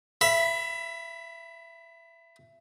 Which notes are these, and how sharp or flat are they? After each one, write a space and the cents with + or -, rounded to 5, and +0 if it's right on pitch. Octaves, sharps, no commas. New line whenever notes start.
E5 +25 B5 -5